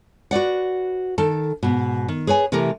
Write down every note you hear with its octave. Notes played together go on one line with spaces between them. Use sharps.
F#4 B4 D5 F#5
D#3 A4 A5
G#2 B2
D#3
G#4 B4 C#5 G#5
C3 E3 A3 G4 A#4